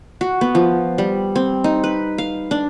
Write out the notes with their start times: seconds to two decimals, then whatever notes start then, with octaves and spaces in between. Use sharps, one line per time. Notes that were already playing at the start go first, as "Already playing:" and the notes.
0.21 F#4
0.41 B3
0.55 F3
0.98 G3
1.36 C4
1.64 D#4
1.84 B4
2.18 F5
2.51 D4